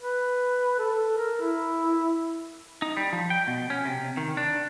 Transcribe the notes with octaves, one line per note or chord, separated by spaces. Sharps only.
B4
A4
A#4
E4
D#4
G3
F3
G5
B2
C#4
C3
D#3
D4